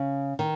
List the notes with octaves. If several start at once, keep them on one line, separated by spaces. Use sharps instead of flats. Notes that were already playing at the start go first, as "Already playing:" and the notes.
Already playing: C#3
D#3